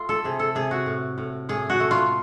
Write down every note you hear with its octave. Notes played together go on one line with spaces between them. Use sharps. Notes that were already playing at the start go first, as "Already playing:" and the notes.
Already playing: A3 F4
A4
C3 G#4
A4
C3 G#4
F#4
A2
A2
A2 G#4
F#4
A3
F4